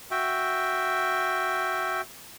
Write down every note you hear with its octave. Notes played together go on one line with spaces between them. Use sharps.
F#4 E5 G5